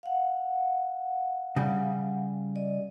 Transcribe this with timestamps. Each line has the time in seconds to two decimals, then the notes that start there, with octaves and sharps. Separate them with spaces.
0.03 F5 F#5
1.56 C#3 G3
2.56 D5 D#5